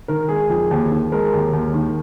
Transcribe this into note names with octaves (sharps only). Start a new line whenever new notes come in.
D#3 A#4
G#3 G#4
F2
D#2
D#3
G#3 A#4
D#2
D#2
D#3